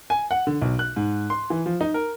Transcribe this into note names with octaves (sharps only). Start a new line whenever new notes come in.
G#5
F#5
D3
B1
F#6
G#2
C6
E3
F3
D#4
A#4